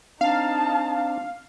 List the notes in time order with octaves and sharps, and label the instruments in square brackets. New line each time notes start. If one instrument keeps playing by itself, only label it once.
[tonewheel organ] C4 D4 [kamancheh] D#4 A5 [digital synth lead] F5